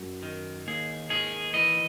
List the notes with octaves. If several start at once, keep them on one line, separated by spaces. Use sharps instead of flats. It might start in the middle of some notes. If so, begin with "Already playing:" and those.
Already playing: F#2
D#3
D#2 G#4
D#3 G#4
E3 D#5